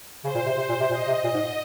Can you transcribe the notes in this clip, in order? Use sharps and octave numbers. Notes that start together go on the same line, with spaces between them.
C#3 C5
A#2
C3
C3
A#2
C3
A#2 D#5
C3
A#2
G#2